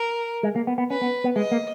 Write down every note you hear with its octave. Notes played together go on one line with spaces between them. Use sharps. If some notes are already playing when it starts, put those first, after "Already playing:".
Already playing: A#4
G#3
A#3
B3
B3
C#4 B4
B3
B3
G#3 D#5
A#3